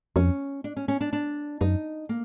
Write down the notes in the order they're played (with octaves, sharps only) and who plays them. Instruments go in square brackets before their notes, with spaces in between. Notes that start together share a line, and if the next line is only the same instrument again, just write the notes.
[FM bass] F2 [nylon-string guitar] C#4
[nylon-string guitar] D4
C#4
C#4
D4
D4
[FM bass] F#2 [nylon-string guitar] D#4
[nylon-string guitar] A#3